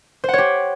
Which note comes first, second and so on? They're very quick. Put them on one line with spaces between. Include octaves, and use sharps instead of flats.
C5 F#5 C#5 G4